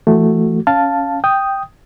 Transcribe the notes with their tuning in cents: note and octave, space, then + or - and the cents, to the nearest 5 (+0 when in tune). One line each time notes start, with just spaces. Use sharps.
E3 +35 A3 +5 F#4 +0
C#4 +0 F5 +0 A5 +0
G5 +0 D#6 +0